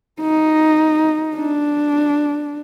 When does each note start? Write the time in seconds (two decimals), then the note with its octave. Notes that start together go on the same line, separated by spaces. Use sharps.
0.21 D#4
1.36 D4